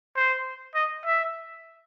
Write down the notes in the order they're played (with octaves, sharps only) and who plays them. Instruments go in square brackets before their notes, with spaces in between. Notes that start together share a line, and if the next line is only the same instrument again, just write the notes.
[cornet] C5
D#5
E5